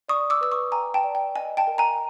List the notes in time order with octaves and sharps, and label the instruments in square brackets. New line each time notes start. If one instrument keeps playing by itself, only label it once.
[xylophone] D5 C#6 D#6
D6 E6
B4 E6
C#6 D#6
G5 G#5 A#5
G5 A5
D5
G5
D#5 G#5
G5 A5
A#4
G#5 A#5